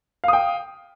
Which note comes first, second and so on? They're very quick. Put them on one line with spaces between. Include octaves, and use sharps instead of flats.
F5 D#6 G5